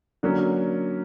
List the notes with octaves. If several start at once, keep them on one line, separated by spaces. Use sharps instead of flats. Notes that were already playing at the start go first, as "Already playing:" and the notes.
D3 F#3 A#3 C#4